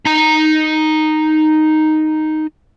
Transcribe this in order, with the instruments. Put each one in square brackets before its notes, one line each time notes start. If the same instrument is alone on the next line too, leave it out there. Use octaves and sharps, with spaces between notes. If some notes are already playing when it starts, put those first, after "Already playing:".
[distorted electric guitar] D#4 A#5